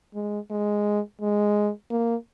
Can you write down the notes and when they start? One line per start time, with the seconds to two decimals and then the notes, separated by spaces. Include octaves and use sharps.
0.15 G#3
0.51 G#3
1.21 G#3
1.91 A#3